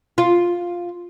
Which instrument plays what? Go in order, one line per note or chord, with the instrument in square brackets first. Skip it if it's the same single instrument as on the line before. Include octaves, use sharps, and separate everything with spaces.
[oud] F4